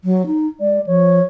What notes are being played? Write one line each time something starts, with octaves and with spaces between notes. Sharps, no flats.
F#3
D#4
G#3 D5
F3 C#5